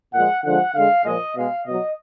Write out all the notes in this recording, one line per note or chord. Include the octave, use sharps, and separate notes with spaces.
A#2 F3 G#3 F#5
D3 F3 G#3 F#5
D3 G#3 F5
A#2 F3 G#3 D#5
B2 G#3 F5
B2 F#3 D#5